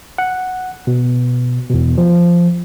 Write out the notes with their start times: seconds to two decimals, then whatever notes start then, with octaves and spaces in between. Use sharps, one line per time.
0.18 F#5
0.87 B2
1.70 E2 B2
1.98 F3